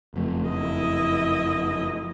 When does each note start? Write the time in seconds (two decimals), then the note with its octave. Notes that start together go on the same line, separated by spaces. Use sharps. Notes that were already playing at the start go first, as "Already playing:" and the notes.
0.14 F#1 F2 A3
0.49 E4 D#5